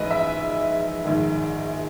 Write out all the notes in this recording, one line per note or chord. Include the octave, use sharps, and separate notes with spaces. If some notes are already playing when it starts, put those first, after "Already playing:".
Already playing: A#1 G#2 E3 B4 D#5
E5
A#1 G#2 D#3